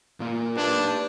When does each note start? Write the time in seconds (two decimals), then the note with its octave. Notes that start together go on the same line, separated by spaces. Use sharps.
0.20 A#2 A#3
0.57 D4 B4 D5